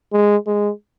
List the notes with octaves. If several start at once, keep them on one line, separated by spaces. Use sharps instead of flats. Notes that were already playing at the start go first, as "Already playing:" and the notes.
G#3
G#3